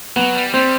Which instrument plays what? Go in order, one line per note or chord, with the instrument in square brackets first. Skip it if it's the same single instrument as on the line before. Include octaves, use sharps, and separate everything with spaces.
[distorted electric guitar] F#3 [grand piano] B3
[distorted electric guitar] G3
[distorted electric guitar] G3 [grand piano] C4